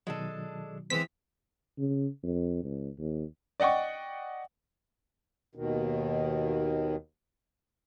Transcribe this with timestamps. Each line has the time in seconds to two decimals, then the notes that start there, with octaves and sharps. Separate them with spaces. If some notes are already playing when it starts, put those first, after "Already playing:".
0.07 B2 D#3 F#3 G#3 D4 A4
0.90 E3 G#3 C4 B6
1.78 C#3
2.23 F2
2.64 C#2
2.99 D#2
3.60 D5 D#5 F#5 G5 C#6
5.55 D#2 B2 D#3